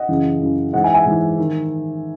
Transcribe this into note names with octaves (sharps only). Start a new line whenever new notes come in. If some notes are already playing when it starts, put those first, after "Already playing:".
Already playing: D#5 F#5
F#2 C#3 E3
F#2 C#3 E3
G#2 E3 D#5 F#5
E5 G#5
E5 G#5
G#2 E3
D#3